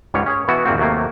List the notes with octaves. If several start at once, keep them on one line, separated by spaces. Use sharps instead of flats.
C#2 G#2 G3 C#5
C#4 G#4 C#5
B2 E3 B3 E4 F#4
G#1 E2 F3 A#3 C4 F#4
D#2 C3 F#3 A3 A#3